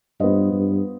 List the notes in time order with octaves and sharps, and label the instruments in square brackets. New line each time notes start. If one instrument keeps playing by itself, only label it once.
[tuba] G2 [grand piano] B3 F4 C5 D#5
[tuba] G2